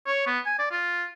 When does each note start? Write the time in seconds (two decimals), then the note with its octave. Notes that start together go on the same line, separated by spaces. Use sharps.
0.07 C#5
0.27 B3
0.46 G#5
0.59 D5
0.71 F4